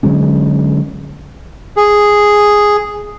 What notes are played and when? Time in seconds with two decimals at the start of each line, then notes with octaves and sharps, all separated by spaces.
0.03 D3 F#3 G#3 C#4
1.77 G#4